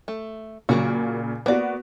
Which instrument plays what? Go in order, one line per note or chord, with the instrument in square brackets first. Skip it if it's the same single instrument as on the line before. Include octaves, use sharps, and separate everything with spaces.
[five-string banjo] A3
[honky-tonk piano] A#2 C#3 [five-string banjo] F#3 A#3 F#4
[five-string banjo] A#3 D5 [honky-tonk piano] B3 F#4